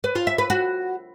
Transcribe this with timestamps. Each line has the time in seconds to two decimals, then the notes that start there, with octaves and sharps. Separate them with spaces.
0.04 B4
0.15 F4
0.27 E5
0.38 B4
0.50 F#4